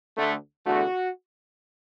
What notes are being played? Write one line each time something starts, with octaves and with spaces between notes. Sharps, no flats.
D2 D3 A3
E2 D3 A3 F#4